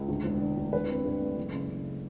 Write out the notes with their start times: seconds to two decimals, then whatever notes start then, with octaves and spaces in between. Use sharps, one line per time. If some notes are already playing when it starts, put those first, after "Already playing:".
Already playing: C#2
0.08 D2
0.24 E1
0.41 D3
0.57 D2
0.73 E3 B4
0.89 C4
1.05 G2
1.21 A3
1.37 F#1
1.53 C#3
1.70 C#3